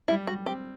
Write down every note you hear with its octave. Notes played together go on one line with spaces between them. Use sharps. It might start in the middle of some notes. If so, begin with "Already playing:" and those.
G3 E4
G3 F#4
C4 G4